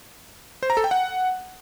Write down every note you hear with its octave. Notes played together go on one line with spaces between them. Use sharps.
C5
A#5
A4
G5
F#5